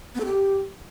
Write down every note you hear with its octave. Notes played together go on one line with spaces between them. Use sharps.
B3
A4
G4